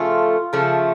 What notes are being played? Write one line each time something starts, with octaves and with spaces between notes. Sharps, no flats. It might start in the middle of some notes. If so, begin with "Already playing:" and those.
Already playing: C#3 F3 A3 F4
C#3 F3 A3